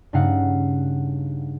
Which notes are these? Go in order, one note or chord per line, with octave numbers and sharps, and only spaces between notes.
G2 C#3 A3 D#4 F5 F#5